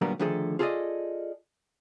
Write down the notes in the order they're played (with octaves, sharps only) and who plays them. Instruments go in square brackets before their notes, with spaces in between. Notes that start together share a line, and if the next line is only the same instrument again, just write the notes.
[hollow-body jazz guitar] A#2 D3 F#3 G3 B3 A#4
D3 D#3 F3 A3 G#4 A4
F4 G#4 A4 C5 D5 D#5